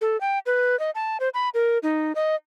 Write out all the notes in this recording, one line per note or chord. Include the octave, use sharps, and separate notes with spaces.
A4
G5
B4
D#5
A5
C5
B5
A#4
D#4
D#5